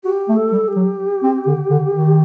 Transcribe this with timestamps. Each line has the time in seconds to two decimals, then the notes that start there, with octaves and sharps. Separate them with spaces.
0.04 F#4 G4
0.28 A3
0.36 A4
0.52 G3
0.68 G4
0.76 F#3
1.23 C4
1.47 D3
1.70 D3
1.94 D#3